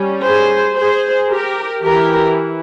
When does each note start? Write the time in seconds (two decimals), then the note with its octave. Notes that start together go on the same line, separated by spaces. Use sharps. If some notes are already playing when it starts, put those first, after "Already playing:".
Already playing: G3 C#4
0.24 G#4 C5
0.77 G#4 C5
1.30 G4 A#4
1.83 E3 G4 A#4